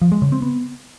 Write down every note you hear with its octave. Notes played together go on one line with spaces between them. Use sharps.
F3
G#3
C#3
C4
B3